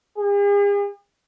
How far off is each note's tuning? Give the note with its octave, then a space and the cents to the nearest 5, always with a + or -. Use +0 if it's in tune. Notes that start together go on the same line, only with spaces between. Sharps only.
G#4 -45